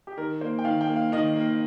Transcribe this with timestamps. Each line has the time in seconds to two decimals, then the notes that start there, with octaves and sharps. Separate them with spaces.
0.07 G4
0.17 D#3 A#4
0.41 A#3 C5
0.59 G5
0.65 D#3 F5
0.81 G5
0.88 A#3
0.96 F5
1.12 D#3 D#5
1.36 A#3